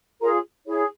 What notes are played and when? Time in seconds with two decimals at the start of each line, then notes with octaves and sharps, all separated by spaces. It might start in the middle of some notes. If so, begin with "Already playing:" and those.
0.20 F4 G#4 A#4 C#5 A#5
0.66 E4 G#4 C#5